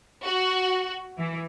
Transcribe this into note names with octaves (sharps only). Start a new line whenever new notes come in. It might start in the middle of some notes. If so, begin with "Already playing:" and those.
F#4
E3